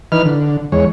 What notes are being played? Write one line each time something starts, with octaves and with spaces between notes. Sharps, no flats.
E3 D#4 B4 F6
D3
E2 G#3 C#5